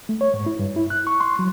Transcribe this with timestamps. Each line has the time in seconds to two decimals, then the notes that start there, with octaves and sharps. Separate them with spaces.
0.09 A3
0.21 C#5
0.34 G#2
0.46 E4
0.59 G2
0.76 E4
0.90 F#6
1.07 C#6
1.20 C6
1.39 F#3